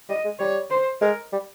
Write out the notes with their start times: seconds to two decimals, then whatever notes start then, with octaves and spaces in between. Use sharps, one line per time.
0.09 G3 D#5
0.25 G#3
0.39 G3 C#5
0.70 C5
1.01 G#3 A#4
1.32 G3